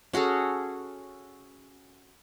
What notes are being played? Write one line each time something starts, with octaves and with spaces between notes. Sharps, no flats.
C#4 F#4 G#4 A4